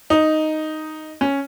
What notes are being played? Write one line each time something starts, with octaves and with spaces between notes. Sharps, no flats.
D#4
C#4